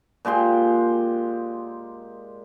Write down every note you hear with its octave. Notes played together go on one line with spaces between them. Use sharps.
A#2 G#3 G4 C6